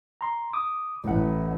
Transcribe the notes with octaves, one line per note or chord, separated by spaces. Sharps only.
A#5 C6
D6 D#6
A1 A2 F#5